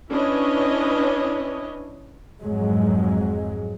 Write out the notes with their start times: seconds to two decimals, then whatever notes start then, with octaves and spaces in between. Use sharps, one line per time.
0.11 C#4 D4 E4 B4 C#5 D#5
2.42 F2 G#2 F#3 G#3